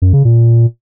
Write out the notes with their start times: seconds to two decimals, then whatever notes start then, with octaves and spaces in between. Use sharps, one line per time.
0.02 F#2
0.13 C#3
0.25 A#2